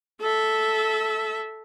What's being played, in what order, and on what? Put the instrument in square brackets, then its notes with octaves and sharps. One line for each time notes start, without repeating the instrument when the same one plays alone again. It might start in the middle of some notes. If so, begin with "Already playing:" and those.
[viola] A4 E5